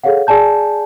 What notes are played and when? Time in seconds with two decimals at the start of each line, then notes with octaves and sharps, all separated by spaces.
0.03 G#4 A4 C#5 F5 F#5
0.27 G#4 D5 G#5 A5 G6